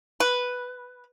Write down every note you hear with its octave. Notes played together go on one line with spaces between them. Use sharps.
B4